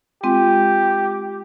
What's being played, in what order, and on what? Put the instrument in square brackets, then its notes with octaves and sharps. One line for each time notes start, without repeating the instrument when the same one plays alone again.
[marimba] G#3 C4 F4 [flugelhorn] G4